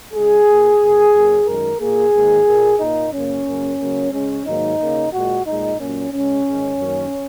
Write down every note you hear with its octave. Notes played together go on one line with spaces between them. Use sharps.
C#3 G#3 G#4
A#2 A#3
F#2 C#3 A#3
F#2 F#3 A#3
F#2 D#3 G#3 A#4
A#2 A#3 G#4
G#2 D#3 A#3
A#2 A#3
A#2 A#3 D#4
F#2 C#3 A#3 C#4
F#2 C#3 A#3
C#3 F#3 A#3
C#3 G#3 C#4
G#2 D#3 F#3 A#3 D#4
C#3 A#3
A#2 G#3 F#4
A#2 G#3 D#4
A#2 F#3 A#3 C#4
C#3 G#3 C#4
G#2 D#3 G#3
F#2 D#3 A#3